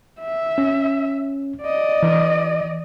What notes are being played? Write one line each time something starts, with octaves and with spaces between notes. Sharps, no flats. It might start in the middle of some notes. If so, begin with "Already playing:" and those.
E5
C#4
D5 D#5
E3